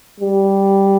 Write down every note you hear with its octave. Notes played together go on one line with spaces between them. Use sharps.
G3